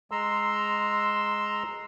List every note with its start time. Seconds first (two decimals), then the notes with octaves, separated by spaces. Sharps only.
0.11 G#3 A#5 C6 E6